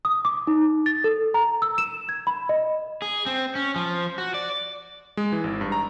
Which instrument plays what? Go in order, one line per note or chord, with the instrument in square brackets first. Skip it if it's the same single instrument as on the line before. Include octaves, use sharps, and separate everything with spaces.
[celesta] D#6
D6
D#4
A6
A4
A#5
E6
E7
G#6
B5
D#5
[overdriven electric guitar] G#4
C4
C#4
F3
F#4
D5
[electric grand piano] G#3
E3
G#1
G2
A#5